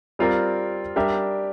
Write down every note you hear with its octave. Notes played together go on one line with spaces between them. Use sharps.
G3 C4 F4 A#4 D5
G3 D4 G4 A#4 E5